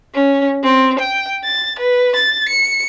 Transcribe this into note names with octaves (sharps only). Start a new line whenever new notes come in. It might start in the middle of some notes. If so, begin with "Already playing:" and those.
C#4
C4
G5
A6
B4
A6
C#7